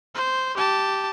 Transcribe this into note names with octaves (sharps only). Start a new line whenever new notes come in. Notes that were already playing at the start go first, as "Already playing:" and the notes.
C5
G4 A5